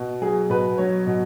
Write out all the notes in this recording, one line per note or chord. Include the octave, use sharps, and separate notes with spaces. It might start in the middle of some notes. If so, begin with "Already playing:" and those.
Already playing: B2
F#3 G#4
B2 B4
F#3 C#5
B2